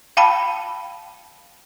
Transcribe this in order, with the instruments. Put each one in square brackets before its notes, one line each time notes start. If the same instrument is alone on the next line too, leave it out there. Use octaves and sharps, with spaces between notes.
[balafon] F5 G5 A5 B5